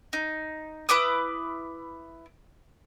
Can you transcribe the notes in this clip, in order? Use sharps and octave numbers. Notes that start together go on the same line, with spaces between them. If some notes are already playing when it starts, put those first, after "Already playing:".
D#4
E4 B4 D6 D#6